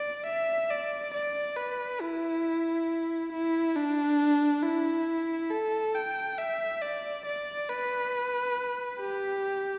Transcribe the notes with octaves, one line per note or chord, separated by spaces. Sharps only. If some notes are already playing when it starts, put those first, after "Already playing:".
Already playing: D5
E5
D5
D5
B4
E4
E4
D4
E4
A4
G5
E5
D5
D5
B4
G4